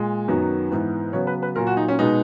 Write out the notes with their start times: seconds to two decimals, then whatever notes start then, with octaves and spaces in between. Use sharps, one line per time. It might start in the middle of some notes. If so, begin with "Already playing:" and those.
Already playing: A#2 G#3
0.28 F#2 D#3 F#3 B3
0.70 G#2 E3 B3
1.13 C#3 F#3 B3 C#5
1.27 B4
1.43 B4
1.56 A#2 F#3 A#3 A#4
1.67 F#4
1.77 D#4
1.88 C#4
1.99 B2 G#3 B3 D#4